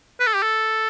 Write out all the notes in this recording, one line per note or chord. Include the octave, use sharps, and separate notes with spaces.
B4
A4
G4
A4